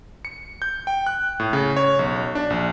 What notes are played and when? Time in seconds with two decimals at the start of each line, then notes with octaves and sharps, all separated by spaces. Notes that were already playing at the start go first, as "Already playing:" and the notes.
0.25 C#7
0.62 G6
0.87 G5
1.07 F#6
1.40 A2
1.53 C#3
1.76 C#5
1.99 B1
2.35 D4
2.50 A#1